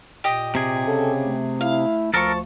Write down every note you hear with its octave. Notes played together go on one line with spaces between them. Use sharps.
A#2 G4 D#5
C3 G#4
C#3 A4
A3
E4 F5
D2 F3 A4 A#4 A5 C#6